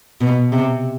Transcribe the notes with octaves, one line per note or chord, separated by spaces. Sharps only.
B2
C3